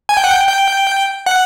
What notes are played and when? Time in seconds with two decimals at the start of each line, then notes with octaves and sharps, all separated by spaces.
0.09 G#5
0.17 G5
0.24 F#5
0.31 G5
0.48 G5
1.26 F#5